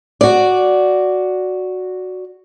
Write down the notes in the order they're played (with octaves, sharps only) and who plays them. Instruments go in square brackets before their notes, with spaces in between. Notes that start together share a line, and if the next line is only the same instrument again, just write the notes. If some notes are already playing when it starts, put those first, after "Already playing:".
[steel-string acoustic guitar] F#4 D5